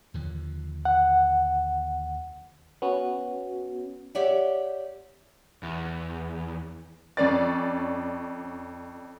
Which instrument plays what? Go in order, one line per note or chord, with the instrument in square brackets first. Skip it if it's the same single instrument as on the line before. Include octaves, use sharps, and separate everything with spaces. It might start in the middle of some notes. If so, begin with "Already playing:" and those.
[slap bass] D#2 D3 F3
[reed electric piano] F#5
[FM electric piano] B3 C#4 F#4
[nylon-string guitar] G4 C#5 D5 E5 F#5
[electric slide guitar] E2
[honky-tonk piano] F2 C#4 D5 A6